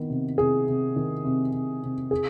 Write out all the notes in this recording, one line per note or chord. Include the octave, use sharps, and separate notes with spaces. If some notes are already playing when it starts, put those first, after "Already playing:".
Already playing: D#3 B3
C3
C3 G#4
C3
D#3
C3
C3
C3
G#4